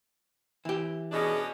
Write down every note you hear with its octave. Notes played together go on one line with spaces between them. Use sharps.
E3 G4
B2 C#4 D4 G#4 D#5